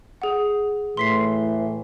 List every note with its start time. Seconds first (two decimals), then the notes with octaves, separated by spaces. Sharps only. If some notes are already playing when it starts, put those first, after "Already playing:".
0.22 G#4 F#5
0.97 A2 E3 C6 B6 C7